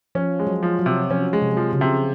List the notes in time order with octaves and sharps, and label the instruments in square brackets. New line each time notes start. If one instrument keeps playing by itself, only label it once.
[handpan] F3 [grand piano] C#4
[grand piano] G#3
[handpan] F#3
[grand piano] F3
[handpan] F#3
[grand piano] C3
[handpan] F3 [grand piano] C#4
[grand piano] G#3
[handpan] C3
[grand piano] F3
[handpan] C#3
[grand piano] C3